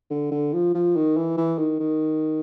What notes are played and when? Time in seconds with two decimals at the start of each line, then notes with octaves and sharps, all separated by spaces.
0.11 D3
0.31 D3
0.53 F3
0.74 F3
0.96 D#3
1.17 E3
1.37 E3
1.58 D#3
1.80 D#3